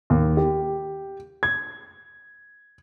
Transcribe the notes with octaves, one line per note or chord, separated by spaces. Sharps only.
D#2
G4
G#6